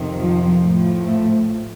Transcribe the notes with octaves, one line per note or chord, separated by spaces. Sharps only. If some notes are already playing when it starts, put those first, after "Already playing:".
Already playing: F2 C3 D#3
F3
A2 F3
A3